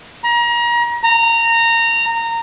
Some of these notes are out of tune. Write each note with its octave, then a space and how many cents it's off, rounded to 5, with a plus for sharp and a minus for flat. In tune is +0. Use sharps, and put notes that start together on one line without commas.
A#5 +30
A#5 -20